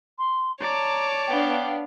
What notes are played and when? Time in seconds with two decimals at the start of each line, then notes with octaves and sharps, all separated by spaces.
0.18 C6
0.60 C#5 D5 A5 A#5 D6
1.27 B3 D4 F5 G5